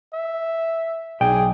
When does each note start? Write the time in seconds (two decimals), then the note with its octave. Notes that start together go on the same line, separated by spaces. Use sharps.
0.13 E5
1.21 B1 G#4 D5 G5